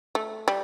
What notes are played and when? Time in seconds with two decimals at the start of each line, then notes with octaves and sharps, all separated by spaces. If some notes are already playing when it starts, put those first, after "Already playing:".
0.15 A3
0.48 G3